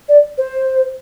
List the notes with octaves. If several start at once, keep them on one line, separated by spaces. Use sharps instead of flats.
D5
C5